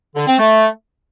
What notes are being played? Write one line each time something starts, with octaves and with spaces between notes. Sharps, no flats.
D3
C4
A3